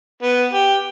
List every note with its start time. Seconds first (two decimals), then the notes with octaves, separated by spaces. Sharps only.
0.23 B3
0.53 G4